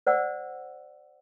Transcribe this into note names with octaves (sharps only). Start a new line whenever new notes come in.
C5 D5 F#5 E6